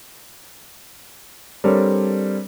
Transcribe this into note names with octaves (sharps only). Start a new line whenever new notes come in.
G3 C4 D4 A4 A#4 C#5